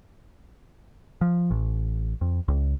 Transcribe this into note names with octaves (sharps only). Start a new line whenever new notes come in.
F3
A1
F2
C#2